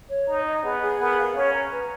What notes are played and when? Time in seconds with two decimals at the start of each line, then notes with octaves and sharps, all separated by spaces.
0.10 C#5
0.28 D#4 A#5
0.46 D#5
0.63 B3 G#4
0.82 G#4
0.99 B3 A#4
1.16 F5
1.35 C#4 C#5
1.52 A#5
1.71 B4